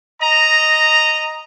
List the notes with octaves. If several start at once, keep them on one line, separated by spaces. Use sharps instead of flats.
D#5 A#5